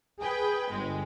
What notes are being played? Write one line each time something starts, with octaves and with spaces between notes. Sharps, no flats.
G#4 B4 G5
G1 G#3